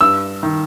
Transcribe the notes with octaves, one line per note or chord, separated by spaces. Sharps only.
G2 E6
D#3